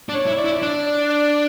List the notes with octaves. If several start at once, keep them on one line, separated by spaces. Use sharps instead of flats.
D4
C#5
E4
D5
E4
D4 D5
D5
D5